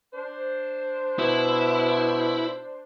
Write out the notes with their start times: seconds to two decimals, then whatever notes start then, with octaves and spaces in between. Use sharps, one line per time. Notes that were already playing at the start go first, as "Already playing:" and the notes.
0.14 D4 C5
1.19 B2 E4